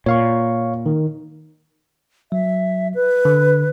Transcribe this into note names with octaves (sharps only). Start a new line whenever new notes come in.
A#2 C#5 F5 C#6
D#3
F#3 E5
B4
D3